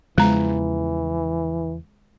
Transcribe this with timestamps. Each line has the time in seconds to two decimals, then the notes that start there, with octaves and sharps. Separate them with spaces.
0.18 E2 C#3 E3 F3 G#3 A#5